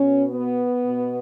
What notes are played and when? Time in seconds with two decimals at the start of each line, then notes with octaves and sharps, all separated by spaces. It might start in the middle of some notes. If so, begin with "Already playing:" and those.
Already playing: B2 C#4
0.31 B3
0.86 B2